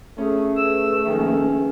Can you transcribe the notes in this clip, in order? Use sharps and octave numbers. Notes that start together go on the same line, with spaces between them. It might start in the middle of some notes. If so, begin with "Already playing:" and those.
A3 C#4 G#4
G#4 B4 E6
A#1 D#3 C#4